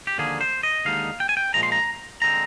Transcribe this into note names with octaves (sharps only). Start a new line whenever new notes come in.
G4
D#2 D3 F3 A#3 G#4
C5
D#5
D#2 D3 G#3 D#4 F5
G5
G#5
G5
A#2 F3 G#3 A#5
C6
A#5
D3 G#3 C4 A#5